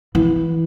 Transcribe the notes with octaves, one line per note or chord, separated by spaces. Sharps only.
E3